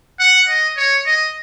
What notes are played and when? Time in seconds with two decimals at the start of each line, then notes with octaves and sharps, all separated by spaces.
0.20 F#5
0.49 D#5
0.77 C#5
1.06 D#5